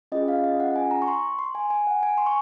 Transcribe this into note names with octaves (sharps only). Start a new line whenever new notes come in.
C#4 F4 G#4 D#5
F5
D#5
F#5
F#5
G#5
A#5
C#6
C6
C6
G#5
G#5
F#5
G#5
C6
C#6